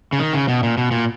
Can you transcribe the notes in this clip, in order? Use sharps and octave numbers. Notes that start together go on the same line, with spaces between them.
C#3
D#3
C#3
B2
A#2
B2
A#2